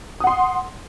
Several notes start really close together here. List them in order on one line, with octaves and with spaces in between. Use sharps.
D#6 F#5 C6